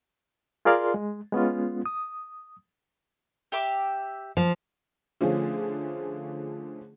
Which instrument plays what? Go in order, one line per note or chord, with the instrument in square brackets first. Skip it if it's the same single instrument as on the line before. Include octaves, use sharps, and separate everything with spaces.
[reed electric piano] F4 G#4 A#4 D5 F5 C6
G#3
G#3 B3 C#4 F4
D#6
[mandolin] G4 E5 D6
[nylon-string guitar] F3
[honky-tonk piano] D3 F3 A3 C#4 F4 G#4